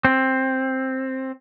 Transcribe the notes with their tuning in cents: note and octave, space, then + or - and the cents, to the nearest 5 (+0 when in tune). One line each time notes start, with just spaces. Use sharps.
C4 +10